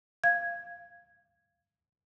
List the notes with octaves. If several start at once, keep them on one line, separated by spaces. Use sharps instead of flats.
F5 G#6